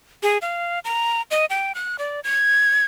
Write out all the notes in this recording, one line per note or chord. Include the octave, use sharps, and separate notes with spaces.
G#4
F5
A#5
D#5
G5
F#6
D5
G#6